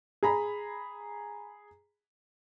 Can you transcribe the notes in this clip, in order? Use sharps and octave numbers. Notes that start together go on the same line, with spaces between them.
G#4 A#5 B5